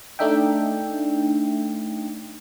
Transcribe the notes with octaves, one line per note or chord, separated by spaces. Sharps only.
A3 D4 D#4 E5 G5